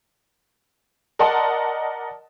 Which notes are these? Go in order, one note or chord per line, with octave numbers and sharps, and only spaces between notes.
A#4 D5 D#5 F#5 A5 C6